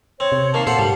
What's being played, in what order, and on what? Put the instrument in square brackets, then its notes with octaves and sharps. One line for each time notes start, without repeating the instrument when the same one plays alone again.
[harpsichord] C4 [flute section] C#5
[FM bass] C3
[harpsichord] D#3 A#3 [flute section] F5 A5
[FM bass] A#2 [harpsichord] A4 C5 F#5
[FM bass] G#2 [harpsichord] G3